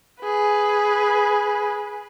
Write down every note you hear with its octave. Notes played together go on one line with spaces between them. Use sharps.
G#4 B4